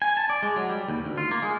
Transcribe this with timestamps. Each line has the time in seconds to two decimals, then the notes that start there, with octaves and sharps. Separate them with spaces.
0.02 G#5
0.17 A5
0.30 D5
0.43 G#3
0.56 F#3
0.69 G3
0.88 D#2
1.05 D2
1.18 F4
1.31 A#3
1.42 G#3